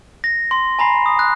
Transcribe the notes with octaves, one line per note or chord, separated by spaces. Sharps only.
A#6
C6
G#5 A#5 B5 C7
D#6
F#6